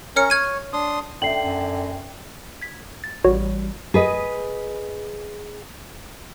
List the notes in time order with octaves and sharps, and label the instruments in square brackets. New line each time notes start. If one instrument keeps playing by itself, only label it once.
[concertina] C#4 A#4 [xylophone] C#5 F6 C#7
[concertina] C#5 [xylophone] F6 G#6 D#7
[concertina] D4 C6 D#6
[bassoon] D3 [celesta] E5 C7 F#7 [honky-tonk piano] G5
[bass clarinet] F#2
[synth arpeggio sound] G#6 B6
A6
[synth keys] A1 G3 [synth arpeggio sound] F#4 C#5
[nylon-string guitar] G#4 B4 D#5